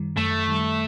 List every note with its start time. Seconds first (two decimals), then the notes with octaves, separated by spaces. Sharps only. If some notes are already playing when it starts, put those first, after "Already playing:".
Already playing: F#2 D#3 G3
0.17 F#2 A3
0.48 D#3 G3